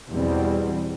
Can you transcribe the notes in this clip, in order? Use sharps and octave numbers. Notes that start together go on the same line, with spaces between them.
E2 B2 G3 C4